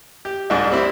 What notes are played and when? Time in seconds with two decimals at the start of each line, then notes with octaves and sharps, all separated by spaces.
0.25 G4
0.50 C2 G#2 D4
0.71 G3 C4 E4